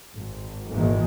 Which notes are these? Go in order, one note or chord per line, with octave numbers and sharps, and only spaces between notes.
G#1
G#1 E2 A#2 D#3 G#3